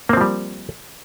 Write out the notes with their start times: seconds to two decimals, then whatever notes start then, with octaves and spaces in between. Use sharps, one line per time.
0.09 A#3
0.13 C4
0.17 F3
0.21 G3